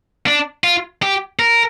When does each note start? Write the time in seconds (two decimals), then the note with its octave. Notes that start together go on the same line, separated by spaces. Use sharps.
0.27 D4
0.64 F4
1.02 G4
1.39 A#4